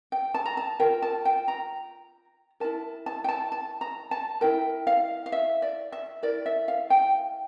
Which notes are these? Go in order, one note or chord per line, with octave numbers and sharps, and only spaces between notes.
G5
A5
A#5
A5
F4 A#4 G5
A5
G5
A#5
E4 A#4 A5
A5
G5
A5
A5
A#5
A5
E4 A#4 G5
F5
F5
E5
D5
E5
E4 A#4 D5
E5
F5
G5